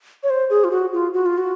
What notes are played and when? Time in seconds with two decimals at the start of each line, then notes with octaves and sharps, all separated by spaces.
0.23 C#5
0.30 C5
0.50 G#4
0.64 F4
0.71 F#4
0.93 F4
1.14 F#4
1.26 F4
1.38 F#4